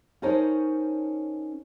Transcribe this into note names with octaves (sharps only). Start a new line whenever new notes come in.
C#4 D#4 A4 A#4 C5 C#5